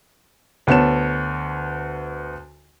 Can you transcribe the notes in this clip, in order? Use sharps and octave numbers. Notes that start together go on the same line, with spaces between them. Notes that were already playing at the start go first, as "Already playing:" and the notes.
D2 B3 C#5 A5 E7